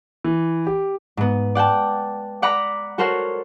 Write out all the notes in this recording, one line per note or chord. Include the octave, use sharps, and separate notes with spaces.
E3
G4
G#2 B3
D5 F#5 G5 A5
D5 F#5 A#5 B5 D6
F#4 A4 A#4 C5 C#5 F#5